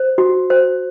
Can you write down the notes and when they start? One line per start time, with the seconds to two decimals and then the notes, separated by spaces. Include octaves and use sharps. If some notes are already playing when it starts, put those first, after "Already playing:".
Already playing: C5
0.18 F#4
0.50 C5